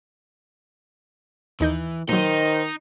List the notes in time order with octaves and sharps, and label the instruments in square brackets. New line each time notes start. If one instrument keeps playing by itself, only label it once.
[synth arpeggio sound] D#2 D#4 G6 [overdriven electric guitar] E3
[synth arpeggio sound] A#2 F#3 [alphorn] D#3 [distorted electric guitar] D#4 [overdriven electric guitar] C5